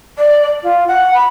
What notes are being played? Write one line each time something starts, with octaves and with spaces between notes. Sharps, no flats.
D5
F4
F#5
B5